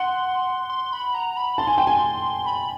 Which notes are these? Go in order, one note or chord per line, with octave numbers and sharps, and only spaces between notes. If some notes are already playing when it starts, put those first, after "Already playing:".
Already playing: F#5 C6
C6
B5
A#5
B5
A5 C6
G#5
G5
G#5
B5